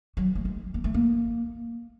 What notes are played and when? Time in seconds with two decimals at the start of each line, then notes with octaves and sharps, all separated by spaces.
0.17 F#3
0.35 A3
0.45 G#3
0.74 A#3
0.84 A3
0.94 A#3